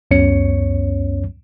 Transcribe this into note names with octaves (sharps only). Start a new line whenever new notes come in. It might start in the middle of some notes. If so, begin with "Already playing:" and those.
C#2 F#2 B3 C#4 C#5 C#7